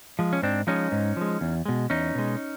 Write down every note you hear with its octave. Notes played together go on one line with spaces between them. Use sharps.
F3 G#3
C#4
G#2 C4 D4
F3 G#3 C#4 D#4
G#2
F3 G#3
E2
B2 G#3
E2 C#4 D#4
B2 G#3